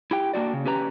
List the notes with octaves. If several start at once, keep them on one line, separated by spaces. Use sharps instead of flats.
E4 G4 G5
A#3 D4 F#4 D5
C#3
C#4 G4 B4 A#5